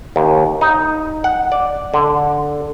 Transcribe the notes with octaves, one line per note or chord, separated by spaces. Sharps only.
D#2
D#4
F#5
D5
D3